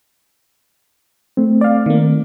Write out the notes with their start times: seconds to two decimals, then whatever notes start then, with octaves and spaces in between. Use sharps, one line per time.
1.37 A3 C4
1.61 D5 F5
1.86 D#3 A#3